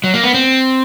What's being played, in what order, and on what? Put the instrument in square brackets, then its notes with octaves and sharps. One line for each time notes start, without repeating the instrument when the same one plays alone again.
[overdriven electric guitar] F#3
A#3
B3
C4